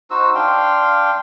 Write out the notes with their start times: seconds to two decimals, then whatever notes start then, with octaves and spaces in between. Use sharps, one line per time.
0.11 D#4 F#4 C5 E6
0.35 D4 F5 G5 C6